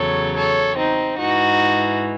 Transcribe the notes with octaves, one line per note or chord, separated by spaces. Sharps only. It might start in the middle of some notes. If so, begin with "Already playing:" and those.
Already playing: E2 C#3 F#3 A4 C#5
A4 C#5
C4 D#4
G#2 E3 D#4 F#4